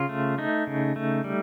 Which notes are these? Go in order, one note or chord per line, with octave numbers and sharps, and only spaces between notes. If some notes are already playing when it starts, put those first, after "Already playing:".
Already playing: C#3 F4
A3
A3 D#4
C#3
A3
G3